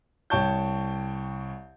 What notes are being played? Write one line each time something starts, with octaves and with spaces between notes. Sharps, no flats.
C2 C#5 G5 A5 C#6 G6